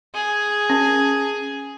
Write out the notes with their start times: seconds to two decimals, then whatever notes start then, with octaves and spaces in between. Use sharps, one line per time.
0.14 G#4
0.70 C#4